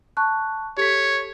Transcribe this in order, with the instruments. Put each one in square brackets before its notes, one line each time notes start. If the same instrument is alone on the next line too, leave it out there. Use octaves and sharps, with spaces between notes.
[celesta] A5 C#6 F#6
[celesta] G4 A4 B6 [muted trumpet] C#5